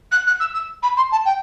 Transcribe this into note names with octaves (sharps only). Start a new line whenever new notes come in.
F#6
F#6
E6
E6
B5
C6
A5
G5